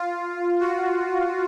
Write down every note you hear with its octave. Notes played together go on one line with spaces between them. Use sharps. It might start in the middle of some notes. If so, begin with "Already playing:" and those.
Already playing: F4
F#4